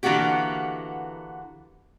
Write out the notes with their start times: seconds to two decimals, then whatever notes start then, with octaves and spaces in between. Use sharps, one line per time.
0.03 D3 E3 A#3 B3 F#4 G4